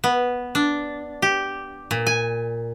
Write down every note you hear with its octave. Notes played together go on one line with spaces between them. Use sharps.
B3
D4
G4
A#2
G#5